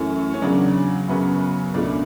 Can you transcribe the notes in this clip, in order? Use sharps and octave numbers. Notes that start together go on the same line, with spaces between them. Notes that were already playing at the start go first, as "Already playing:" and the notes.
Already playing: F#2 E3 A3 C#4
C#4
E2 C#3 F#3 D4
F#2 C#3 F#3 B3
C#2 B2 A3 D4